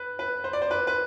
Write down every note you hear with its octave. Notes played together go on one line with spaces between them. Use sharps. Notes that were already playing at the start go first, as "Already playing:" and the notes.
Already playing: B4
B4
C5
D5
C5
B4
B4